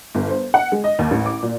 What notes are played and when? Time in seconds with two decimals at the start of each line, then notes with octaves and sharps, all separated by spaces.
0.15 G1
0.29 C5
0.54 F#5
0.72 G#3
0.84 D#5
0.99 D#2
1.11 A1
1.26 D6
1.43 A#2